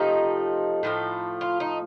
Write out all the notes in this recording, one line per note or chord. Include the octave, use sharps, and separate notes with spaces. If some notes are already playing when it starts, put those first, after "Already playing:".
Already playing: C3 F3 A3 D#4
A2 F3 A3
F4
D#4